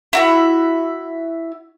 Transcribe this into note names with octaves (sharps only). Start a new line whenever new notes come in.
E4 F#4 E5